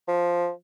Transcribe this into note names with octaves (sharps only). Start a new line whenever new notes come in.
F3